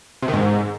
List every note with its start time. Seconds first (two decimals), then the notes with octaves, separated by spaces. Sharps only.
0.22 C3
0.28 D#3
0.33 G#2